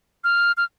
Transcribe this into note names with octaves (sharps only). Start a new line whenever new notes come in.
F6
F6